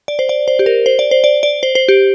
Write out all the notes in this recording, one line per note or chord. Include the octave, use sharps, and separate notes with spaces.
D5
C5
D5
C5
G4
A#4
C5
D5
C5
D5
D5
C5
C5
G4